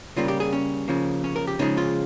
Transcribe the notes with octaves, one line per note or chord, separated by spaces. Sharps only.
C#3 G3 A#3 F4
G4
G#4
C#4
C#3 F3 A#3
C#4
A#4
G4
C#3 F3 G#3 D#4
F4